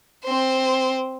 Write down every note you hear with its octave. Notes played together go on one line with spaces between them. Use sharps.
C4 C5